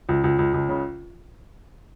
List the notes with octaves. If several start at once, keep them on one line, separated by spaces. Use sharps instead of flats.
C#2
C#2
C#2
C#2
C#3